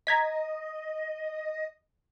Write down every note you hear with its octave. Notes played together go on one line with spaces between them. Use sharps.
D#5 A#5 G#6 B6